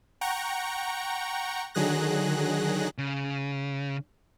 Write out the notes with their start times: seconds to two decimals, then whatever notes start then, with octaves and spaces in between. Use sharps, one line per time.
0.21 F#5 G5 A#5 C#6
1.74 D3 D#3 F#3 G#4 F#6 A#6
2.98 C#3